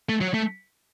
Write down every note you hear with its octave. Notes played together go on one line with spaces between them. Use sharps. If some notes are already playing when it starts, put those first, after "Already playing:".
A3
F#3
A3